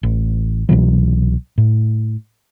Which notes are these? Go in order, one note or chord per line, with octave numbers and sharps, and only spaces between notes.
A1
C2 B2 E3 F#3
A2